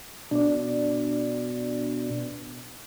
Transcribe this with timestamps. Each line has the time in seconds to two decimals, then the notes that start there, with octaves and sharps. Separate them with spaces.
0.31 B2 D4 D5